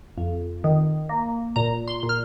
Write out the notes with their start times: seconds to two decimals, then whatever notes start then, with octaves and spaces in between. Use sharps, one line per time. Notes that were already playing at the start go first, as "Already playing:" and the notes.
0.18 F2
0.64 D#3
1.09 A#3
1.56 A#2 A#5
1.88 C6
2.03 A#2
2.09 F6